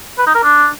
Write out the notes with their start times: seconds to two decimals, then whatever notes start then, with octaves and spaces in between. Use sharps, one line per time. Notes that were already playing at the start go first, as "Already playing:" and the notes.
0.18 B4
0.27 D#4
0.35 A#4
0.43 D4